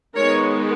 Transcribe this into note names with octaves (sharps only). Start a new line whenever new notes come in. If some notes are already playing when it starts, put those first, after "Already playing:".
D#3 G#3 B3 A#4 C#5